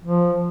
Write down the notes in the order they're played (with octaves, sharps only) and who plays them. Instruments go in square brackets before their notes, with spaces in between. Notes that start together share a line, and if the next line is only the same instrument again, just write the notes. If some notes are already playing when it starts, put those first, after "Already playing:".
[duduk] F3